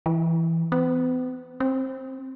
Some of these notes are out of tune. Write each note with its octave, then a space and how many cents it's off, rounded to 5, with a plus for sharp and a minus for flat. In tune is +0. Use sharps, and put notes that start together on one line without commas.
E3 +0
B3 +45
C4 +15